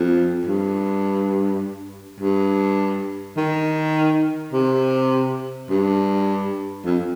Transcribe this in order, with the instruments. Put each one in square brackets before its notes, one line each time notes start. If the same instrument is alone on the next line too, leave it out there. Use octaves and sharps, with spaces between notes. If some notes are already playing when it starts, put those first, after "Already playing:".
Already playing: [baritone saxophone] F2
G2
G2
D#3
C3
G2
F2